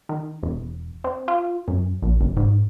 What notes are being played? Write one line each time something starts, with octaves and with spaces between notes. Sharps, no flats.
D#3
E1
C4
F4
F#2
A#1
F#1
G#2